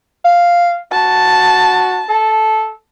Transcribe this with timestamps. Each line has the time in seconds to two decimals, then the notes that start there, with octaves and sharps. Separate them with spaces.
0.25 F5
0.92 F#4 A5
2.09 A4